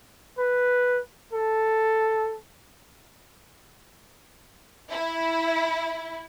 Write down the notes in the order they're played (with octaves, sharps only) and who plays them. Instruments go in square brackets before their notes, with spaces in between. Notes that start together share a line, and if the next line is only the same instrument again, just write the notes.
[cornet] B4
A4
[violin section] E4